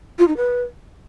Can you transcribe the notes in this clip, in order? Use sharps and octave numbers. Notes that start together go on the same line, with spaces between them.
F4
D#4
B4